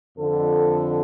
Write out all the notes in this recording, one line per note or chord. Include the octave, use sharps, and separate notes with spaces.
F2 D3 A4